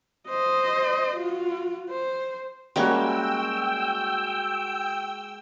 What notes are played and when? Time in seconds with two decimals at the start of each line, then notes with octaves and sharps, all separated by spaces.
0.28 C5 D#5
1.17 F4 F#4
1.90 C5
2.76 G3 G#3 A#3 C#4 F#4 G5 E6